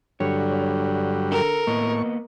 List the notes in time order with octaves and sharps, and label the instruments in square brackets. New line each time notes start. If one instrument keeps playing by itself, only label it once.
[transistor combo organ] G2 F#3 G3 [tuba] D3 [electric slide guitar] C#5
[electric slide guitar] A4 [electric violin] A#4
[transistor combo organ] A2 C#6 [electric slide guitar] A#3 B3 D#5